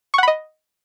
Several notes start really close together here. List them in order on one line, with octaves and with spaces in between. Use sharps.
C#6 F#5 B5 D#5